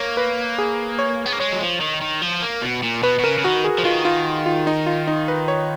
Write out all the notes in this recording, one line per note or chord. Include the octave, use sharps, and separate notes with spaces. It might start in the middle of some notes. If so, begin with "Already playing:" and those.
Already playing: A#3 C#5
B4
G#4
C#5
B3
A#3
G#3 C#5
F#3
F3
D#3
D#3
F3
A#3
B2
A#2
B2 B4
B2
C#3 A#4
C#3
D#3 F#4
G#4
F3
D#3 F4
F4
F4
D#4
F4
D#4
B4
C#5